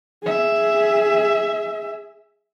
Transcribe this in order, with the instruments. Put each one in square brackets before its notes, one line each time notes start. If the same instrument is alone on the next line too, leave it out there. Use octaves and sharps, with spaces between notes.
[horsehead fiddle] G#4 E5